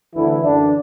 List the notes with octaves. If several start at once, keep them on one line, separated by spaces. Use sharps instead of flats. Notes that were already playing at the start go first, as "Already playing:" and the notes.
D2 D3 E3 E4
F#2 D3 E3 D4